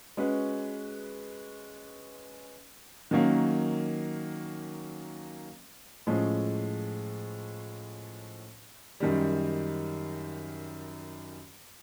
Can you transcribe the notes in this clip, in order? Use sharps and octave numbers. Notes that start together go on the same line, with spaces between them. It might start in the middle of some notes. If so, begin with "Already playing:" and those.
G#3 C#4 F#4 B4
D#3 F#3 A#3 C#4
A2 F3 G#3 C#4
F#2 D#3 G3